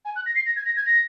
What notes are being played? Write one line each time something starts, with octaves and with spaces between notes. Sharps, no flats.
G#5
F#6
A#6
C7
A#6
G#6
A#6
G#6
A#6